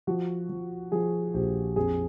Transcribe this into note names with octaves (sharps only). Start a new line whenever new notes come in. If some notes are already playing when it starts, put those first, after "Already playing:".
F3 F#4
F3
F3 G#4
A#1 G4
F2 G#4